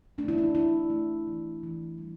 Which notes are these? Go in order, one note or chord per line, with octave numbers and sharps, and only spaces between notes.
A3 D4
E4
D4
A3 E4
A3
E3
E3
G3